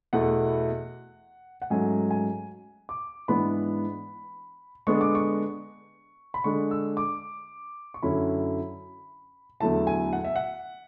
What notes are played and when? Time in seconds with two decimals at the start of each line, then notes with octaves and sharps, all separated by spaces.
0.13 E2 B2 A3 E4 F#5
1.62 F#5
1.70 G#2 F#3 A3 C#4 G#5
2.11 G#5
2.89 D6
3.28 G#2 E3 B3 D4 B5
4.87 D3 G#3 B3 D4 C#6
5.01 D6
5.15 C#6
6.34 B5
6.44 D3 G#3 D4 C#6
6.71 E6
6.97 D6
7.94 C#6
8.03 F#2 D3 F#3 C#4 E4 B5
9.60 E2 D3 F#3 A3 E4 A5
9.87 G#5
10.13 F#5
10.24 E5
10.36 F#5